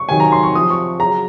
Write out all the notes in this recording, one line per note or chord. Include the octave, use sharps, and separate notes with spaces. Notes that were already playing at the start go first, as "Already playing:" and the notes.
Already playing: C#6
C3 D#3 F#3 G#5
A#5
C6
C#6
C3 F3 D#6
C#6
C#3 F#3 A#5